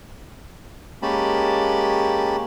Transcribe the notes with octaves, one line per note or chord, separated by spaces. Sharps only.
G#3 A#3 C#4 G4 A5 B5